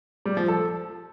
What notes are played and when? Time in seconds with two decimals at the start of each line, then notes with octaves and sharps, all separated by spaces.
0.26 G3
0.37 F3
0.48 A4